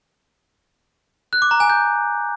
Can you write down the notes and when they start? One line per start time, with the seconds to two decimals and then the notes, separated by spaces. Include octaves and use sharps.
1.33 F#6
1.42 D6
1.51 A#5
1.60 G#5
1.70 G6